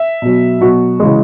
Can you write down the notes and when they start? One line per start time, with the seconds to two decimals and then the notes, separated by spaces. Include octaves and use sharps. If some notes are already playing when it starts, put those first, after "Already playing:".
Already playing: E5
0.22 B2 F#3
0.61 B2 F#3 F#4
1.00 C#3 E3 G#3